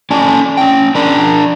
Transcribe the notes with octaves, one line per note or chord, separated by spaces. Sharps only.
C#4 A4 D5 G#5 A5
C#4 G5
D4 A#4 D5